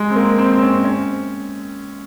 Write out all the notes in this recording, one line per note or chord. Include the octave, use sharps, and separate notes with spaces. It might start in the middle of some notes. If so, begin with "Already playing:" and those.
Already playing: G#3
C4
A#3
C4
C4
C#4
C#4